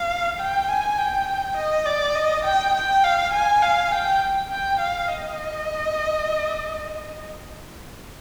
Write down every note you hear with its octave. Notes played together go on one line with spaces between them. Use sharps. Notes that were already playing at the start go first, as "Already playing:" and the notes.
Already playing: F5
G5
G#5
G5
D#5
D5
D#5
G5
G5
F5
G#5
F5
G5
G5
F5
D#5